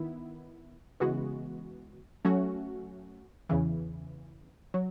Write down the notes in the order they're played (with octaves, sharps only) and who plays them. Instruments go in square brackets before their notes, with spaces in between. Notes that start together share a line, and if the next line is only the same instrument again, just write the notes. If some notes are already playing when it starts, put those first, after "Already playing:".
Already playing: [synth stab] D#3 B3 E4
C#3 E3 G#3 B3 F#4
F#3 A3 C#4 F#4
E2 C#3 E3
F#3